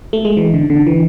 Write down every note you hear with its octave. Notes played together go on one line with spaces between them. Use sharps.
A3
G#3
E3
D3
D3
E3